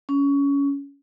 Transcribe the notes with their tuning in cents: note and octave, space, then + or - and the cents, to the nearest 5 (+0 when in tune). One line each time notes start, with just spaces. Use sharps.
C#4 +20